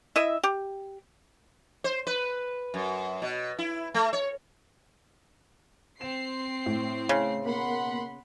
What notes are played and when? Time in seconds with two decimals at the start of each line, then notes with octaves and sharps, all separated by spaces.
0.16 E4 D#5 E5
0.43 G4
1.84 C5
2.07 B4
2.74 F#2
3.22 B2
3.58 E4
3.94 A3
4.13 C#5
6.01 C4 C7 E7
6.66 A2
7.09 C#3
7.45 B2 A#3 F#5 B5 C6